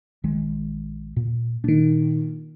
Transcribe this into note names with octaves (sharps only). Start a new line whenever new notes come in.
A#1 D#3 G#3
A#2
A#2 D#3 D4